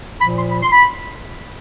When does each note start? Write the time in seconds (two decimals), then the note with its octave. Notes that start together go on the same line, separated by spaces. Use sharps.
0.21 A#2 F3 B5
0.37 C6
0.52 B5
0.62 C6
0.72 B5